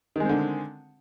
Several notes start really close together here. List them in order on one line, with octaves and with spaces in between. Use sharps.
D#3 G#3 C4 D3